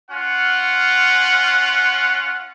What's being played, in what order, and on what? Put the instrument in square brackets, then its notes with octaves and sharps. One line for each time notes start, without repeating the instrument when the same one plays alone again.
[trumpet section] C#4 F4 F#5